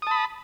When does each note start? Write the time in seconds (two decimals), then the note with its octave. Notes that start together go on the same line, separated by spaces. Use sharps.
0.02 D#6
0.07 A5
0.11 B5